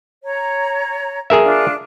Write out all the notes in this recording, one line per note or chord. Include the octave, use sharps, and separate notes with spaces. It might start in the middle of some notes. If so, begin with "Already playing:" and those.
C#5 A#5
G#4 A#4 E5
D4 F4